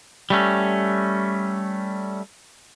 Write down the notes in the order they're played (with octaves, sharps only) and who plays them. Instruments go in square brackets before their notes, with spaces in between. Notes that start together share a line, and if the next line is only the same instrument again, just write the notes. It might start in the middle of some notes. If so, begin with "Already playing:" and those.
[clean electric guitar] G3 A3 C#4